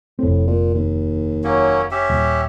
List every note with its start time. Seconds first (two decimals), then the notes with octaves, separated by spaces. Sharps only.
0.19 F1 A2 C4
0.47 A#2
0.75 D#2
1.44 F#3 A#3 C#4
1.91 C#4 G4 E5
2.10 D#1